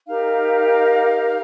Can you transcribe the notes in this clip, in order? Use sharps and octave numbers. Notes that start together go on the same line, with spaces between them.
D#4 G4 A#4 F5